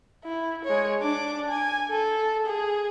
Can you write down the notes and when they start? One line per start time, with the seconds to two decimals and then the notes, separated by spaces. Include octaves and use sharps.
0.24 E4
0.65 G#3 C#5
1.01 D4 D6
1.48 G#5
1.90 A4
2.46 G#4